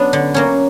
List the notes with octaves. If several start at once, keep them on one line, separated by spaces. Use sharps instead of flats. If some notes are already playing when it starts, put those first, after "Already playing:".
Already playing: F#3 B3 D4
D3
F#3 A#3 C#4